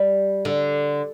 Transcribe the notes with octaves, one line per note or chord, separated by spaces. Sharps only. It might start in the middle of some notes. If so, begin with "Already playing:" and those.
Already playing: G3
D3